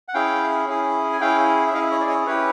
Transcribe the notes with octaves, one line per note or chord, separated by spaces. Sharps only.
F#5
C#4 E4 G#4 F5 G5
C#4 E4 G#4
G#5
C#4 E4 G#4 F5 G5
E5
C#4 E4 G#4 D#5 F5
C#5 D#5
D5
C#5 D#5
C#4 E4 G4 B4 C#5